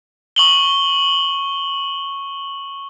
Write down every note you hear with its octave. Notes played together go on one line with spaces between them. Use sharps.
C#6 F#7 G7